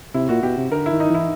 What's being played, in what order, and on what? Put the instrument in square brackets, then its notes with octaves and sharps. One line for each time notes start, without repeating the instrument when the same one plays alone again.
[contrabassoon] C3 [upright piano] E4
[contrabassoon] A#2 [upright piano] F#4
[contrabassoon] B2 [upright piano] G4
[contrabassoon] C3
[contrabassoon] D3 [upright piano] A#4
[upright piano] E4
[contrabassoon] D#3
[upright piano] D#4
[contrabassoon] E3 [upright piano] E4